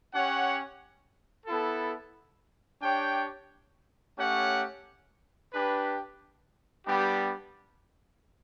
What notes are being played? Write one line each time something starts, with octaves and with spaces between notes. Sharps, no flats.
C#4 G4 C#5 F#5
B3 E4 A4
D4 G4 C#5 G5
A3 C#4 G4 C#5 F#5
D4 G4 B4
G3 B3 D4 G4